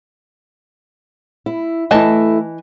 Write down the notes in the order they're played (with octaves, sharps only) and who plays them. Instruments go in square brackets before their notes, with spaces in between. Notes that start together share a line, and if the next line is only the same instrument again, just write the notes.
[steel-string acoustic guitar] E4
[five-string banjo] E3 D#5 A5 [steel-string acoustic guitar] A3 E4